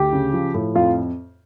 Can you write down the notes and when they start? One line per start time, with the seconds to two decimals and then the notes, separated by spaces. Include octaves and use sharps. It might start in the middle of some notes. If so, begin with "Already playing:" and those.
Already playing: D2 G4 G5
0.13 C#3
0.33 F3
0.54 A2
0.75 F2 F4 F5